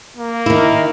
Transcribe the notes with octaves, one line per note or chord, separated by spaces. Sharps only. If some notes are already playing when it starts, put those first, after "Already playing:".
A#3
D#3 E4